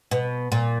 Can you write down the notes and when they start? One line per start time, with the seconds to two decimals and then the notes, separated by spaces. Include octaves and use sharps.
0.11 B2
0.52 A#2